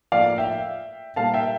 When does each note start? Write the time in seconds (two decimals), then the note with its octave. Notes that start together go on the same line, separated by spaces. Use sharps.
0.12 A2 F3 A#3 D5 F5
0.38 E5 G5
1.16 A#2 G3 A#3 F5 A5
1.34 E5 G5